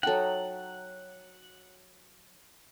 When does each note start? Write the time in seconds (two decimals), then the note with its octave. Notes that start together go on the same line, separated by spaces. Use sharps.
0.03 F#3 D#4 A4 F#5 G5